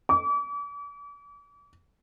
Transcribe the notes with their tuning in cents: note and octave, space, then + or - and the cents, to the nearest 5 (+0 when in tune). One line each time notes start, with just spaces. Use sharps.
D6 -40